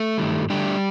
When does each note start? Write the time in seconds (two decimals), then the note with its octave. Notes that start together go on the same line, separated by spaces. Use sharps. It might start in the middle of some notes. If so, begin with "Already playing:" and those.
Already playing: A3 A4
0.18 G2 D#3 G3
0.50 D3 G3 A3 D4 G4